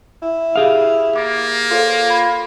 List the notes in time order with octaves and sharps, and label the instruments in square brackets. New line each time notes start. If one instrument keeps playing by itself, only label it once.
[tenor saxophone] E4
[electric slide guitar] G4 G#4 F5
[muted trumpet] A#3 [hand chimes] D6 A6 D7
[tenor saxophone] F4 [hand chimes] A4 C5 C#5
[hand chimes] B5 G#6